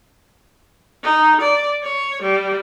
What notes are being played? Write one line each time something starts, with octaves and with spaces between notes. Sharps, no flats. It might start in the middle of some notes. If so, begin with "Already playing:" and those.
D#4
D5
C#5
G3